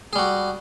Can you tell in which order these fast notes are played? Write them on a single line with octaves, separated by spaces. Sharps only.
G#4 G3 F#4